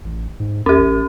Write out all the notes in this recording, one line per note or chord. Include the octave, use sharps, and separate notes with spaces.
A1
G#2
D#2 C#4 G4
A1